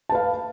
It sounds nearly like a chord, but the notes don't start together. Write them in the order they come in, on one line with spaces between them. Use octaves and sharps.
A5 B4 F5